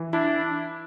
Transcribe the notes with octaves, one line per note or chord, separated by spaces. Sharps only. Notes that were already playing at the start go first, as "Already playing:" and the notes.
Already playing: E3
D4 E4